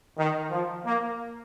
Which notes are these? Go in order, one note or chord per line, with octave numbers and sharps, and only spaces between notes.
D#3
F3
A#3